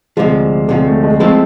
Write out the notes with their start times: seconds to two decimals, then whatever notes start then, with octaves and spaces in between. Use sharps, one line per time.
0.17 D2 C3 F3 G#3
0.68 D2 C3 F3 G#3
0.86 A3
1.04 G#3
1.20 F3 G#3 A3 C4 E4 A4